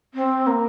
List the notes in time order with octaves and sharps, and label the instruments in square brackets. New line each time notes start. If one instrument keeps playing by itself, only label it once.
[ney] C4
A#3